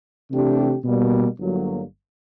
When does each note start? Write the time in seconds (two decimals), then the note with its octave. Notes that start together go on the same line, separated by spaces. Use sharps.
0.31 C3 E3 A3 D4 G4
0.84 B2 G3 A#3
1.39 G1 G2 D3 F#3 A#3